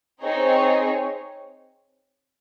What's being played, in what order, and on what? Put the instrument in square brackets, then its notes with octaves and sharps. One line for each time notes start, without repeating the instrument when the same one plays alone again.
[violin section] C4 D#4 G#4 C#5